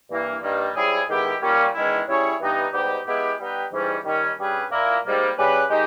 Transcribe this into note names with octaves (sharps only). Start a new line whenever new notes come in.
G2 E3 A#3 E4
G2 D#3 G3 A#3
G#2 G3 C#4 E4 G#4
D#3 G#3 B3 E4 G4
A#2 G3 C#4
E2 D#3 G#3 C#4 E4
G3 C#4 E4 G#4 C#5
G2 E3 G3 B3 D#4
G#2 G3 B3 D#4 G4
G#3 B3 E4 G4
G3 B3 D#4 G4 B4
G#2 E3 G3 C#4
D#3 G3 C#4
G2 G3 C#4 G#4 B4
A#2 A#3 E4 A#4
G#2 G3 A#3
C#3 G3 C#4 G4 B4
D#3 G#3 D#4 G4